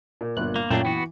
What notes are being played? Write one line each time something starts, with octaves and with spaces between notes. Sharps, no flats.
A#2
G1 A#2 F#6
A#3
F#2 A#2 A3 A#3 C#4 D4 F4 G5
E3 B3 F#4